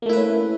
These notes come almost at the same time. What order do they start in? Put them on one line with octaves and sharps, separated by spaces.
A#3 A3 E4 B4 C#4